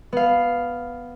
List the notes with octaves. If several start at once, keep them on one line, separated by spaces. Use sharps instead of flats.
B3 F5